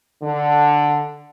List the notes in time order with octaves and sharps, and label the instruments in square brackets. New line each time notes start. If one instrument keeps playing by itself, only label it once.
[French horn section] D3